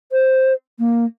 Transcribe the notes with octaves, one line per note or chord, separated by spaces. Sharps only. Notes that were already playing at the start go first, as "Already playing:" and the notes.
C5
A#3